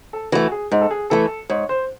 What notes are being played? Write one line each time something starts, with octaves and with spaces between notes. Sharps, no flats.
A4
E3 A3 F#4
G#4
G#2 G#4
A4
G#4
E3 A3 A4
G#2 C#5
C5